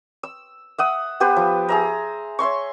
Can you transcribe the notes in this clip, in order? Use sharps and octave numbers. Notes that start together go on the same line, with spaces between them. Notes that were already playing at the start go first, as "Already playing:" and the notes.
E6
E5 F#5 D#6
B3 G4 B4 C5
F3
G#4 E5 A#5
C#5 E5 C6 C#6